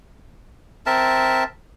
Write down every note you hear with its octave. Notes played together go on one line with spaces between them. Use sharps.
C4 A#4 E5 A5